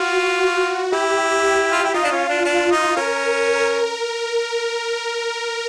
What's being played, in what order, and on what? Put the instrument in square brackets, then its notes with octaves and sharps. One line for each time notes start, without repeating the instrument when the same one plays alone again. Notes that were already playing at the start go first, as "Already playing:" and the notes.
Already playing: [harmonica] F4 [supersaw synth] F#4
[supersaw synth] F#4
[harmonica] E4 [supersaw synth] G4
[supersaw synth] G4
[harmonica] F4
E4
[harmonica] D#4 [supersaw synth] F4
[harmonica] D4
C#4
D4
[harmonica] D4 [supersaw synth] F4
[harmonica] D#4
[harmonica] C#4 [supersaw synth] A#4